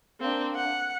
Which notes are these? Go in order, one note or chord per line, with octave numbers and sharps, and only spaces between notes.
A#3 C4 D4
F#5